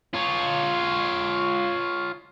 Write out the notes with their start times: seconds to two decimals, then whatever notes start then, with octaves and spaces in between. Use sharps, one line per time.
0.14 F4 C#5